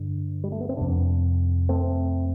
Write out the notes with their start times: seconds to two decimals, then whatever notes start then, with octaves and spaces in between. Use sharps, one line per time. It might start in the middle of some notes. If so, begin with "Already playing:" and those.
Already playing: G2 D3
0.44 G3
0.52 A3
0.61 B3
0.69 C4
0.77 F2 C3 B3 D4
1.69 A3 C4